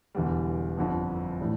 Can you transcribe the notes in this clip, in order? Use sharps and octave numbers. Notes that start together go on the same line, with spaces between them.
E1 E2 D3 G3
G1 F2 D3 F3
A2 E3 G3 D4 G4